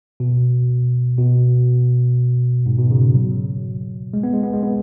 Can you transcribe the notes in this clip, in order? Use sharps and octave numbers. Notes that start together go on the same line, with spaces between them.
B2
B2
G#2
B2
C#3
F#3
G#3
B3
G#3
B3
G#3
B3